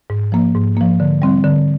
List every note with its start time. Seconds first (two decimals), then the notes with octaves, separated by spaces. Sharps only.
0.10 G#2
0.32 F3 A#3
0.55 G#2
0.77 F3 A#3
1.00 D3
1.22 G3 C4
1.44 D3